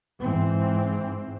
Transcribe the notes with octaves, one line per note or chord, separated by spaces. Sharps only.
G#2 E3 C4